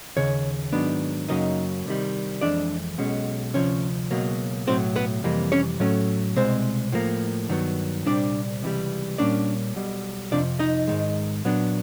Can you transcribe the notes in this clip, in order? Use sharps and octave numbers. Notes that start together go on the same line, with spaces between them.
D#2 C#3 C#5
G#2 D#3 F#3 B3 D4
F#2 C#3 F#3 A#3 D#4 D#5
C2 C3 D#3 G3
F2 C3 E3 G#3 D4 D5
B1 B2 G#3 C#4
D2 C3 F3 C#4 C#5
C#2 B2 F#3 A#3
B1 A2 F#3 C4 C5
B3 B4
F2 C3 E3 G3 A#3
C#4 C#5
A2 F#3 A3 C#4
C2 B2 G#3 C4 C5
A2 F3 A#3
G2 D#3 F#3 B3
C2 A#2 G3 C4 D4 D5
C#2 C3 E3 G3
A#2 G3 A#3 C#4 D4 D5
B1 B2 G3
F2 C3 F3 D4 D5
D#4 D#5
G#2 D#3 G#3
A#2 F#3 B3 D4